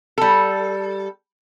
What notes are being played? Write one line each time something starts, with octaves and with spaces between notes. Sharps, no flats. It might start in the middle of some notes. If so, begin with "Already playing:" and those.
G3 A4